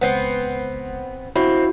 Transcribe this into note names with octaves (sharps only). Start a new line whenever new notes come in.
C#2 B3 C4
C4 E4 F#4